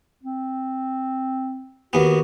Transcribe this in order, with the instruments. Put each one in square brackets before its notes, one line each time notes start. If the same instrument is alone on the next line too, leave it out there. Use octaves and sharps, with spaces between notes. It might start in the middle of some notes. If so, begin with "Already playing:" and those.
[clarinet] C4
[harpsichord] D#2 B3 [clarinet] F#4